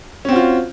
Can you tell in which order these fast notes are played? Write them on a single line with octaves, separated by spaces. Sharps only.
C#4 C4 F#4 F4